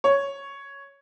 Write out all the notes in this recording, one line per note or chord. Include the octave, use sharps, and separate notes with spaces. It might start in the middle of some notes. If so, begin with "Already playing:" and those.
C#5